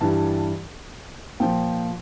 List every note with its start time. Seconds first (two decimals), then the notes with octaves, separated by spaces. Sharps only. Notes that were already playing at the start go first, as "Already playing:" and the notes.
0.01 G2 E3 G3 A5
1.40 A#2 F3 G5